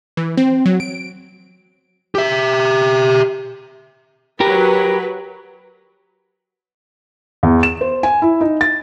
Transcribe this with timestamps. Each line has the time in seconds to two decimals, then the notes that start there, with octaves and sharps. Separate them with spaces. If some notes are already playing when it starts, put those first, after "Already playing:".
0.17 E3
0.37 C4
0.66 F#3
0.80 D7
2.15 G4 E5
4.40 F#3 G4 A#4 B4
7.43 E2
7.63 E7
7.81 C5
8.03 G#5
8.22 E4
8.41 D#4
8.61 A6